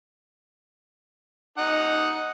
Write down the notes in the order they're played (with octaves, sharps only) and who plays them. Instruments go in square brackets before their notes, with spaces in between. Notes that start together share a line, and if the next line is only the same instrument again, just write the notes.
[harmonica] D#4 F#5